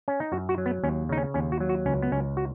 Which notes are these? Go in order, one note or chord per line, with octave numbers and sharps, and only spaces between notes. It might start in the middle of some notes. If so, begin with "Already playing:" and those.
C#4
D#4
F#2 F#4
F#4
F#3
B3
D#2 C#4
C#3 D#4
C#4
D#2 C#4
F#4
F#3
F#4
C#2 C#4
B3
C#2 C#4
F#4